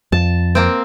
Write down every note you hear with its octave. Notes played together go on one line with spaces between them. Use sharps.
F2 A5
A#3 C4